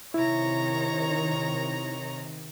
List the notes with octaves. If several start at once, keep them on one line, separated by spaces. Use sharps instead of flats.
C3 D#3 E4 C#5 A#5